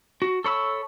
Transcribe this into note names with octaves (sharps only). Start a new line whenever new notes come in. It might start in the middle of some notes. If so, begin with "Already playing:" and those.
F#4
A4 C#5 B5 E6